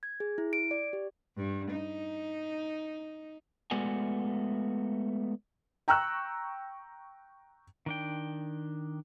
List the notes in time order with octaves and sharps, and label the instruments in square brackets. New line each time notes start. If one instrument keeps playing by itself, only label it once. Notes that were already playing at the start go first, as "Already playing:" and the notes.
[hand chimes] G#6
G#4
E4
D7
D5
G4
[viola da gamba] G2
D#4
[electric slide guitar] G#3 A3 B3 F#4 D5 G#5
[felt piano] G5 A#5 C#6 E6 F#6
[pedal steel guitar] D#3 D4 G5